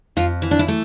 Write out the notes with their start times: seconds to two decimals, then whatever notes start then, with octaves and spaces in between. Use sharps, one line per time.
0.17 F2 F4
0.42 E3
0.51 D4
0.59 E4
0.68 A3